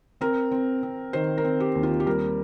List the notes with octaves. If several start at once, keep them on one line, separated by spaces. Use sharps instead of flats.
C4 A#4
C4
C4
D#3 C5
A#4
C4
G4
D#2
F4
G4
G3 A#4